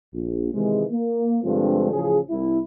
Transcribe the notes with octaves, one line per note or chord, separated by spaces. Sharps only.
A#1
C3 D#3 E3 G#3
A#3
G2 D3 F3 G#3 C4 F4
A1 C#3 F3 G#4
C2 E4